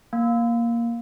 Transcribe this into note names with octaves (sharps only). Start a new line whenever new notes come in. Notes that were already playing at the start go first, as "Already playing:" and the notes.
A#3